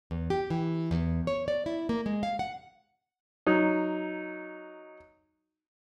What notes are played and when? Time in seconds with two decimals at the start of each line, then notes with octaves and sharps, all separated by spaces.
0.11 E2
0.30 G4
0.50 E3
0.91 E2
1.27 C#5
1.48 D5
1.66 E4
1.89 A#3
2.06 G#3
2.23 F5
2.39 F#5
3.46 F#3 D#4